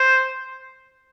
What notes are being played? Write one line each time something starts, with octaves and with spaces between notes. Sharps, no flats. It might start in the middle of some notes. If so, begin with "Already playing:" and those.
Already playing: C5